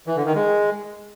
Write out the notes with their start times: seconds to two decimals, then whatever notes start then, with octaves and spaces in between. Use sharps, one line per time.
0.07 E3
0.16 D3
0.26 D#3
0.35 G#3